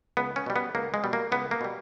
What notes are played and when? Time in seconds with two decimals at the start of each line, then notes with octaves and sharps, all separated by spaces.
0.17 C#2 B3
0.36 C#4
0.46 B2 G3
0.56 B3
0.75 C#2 A#3
0.94 G#3
1.04 B2 G3
1.13 A#3
1.32 C#2 B3
1.51 A#3
1.61 B2 G3